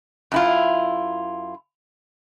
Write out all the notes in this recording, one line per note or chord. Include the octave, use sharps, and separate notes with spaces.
F#2 E4 F4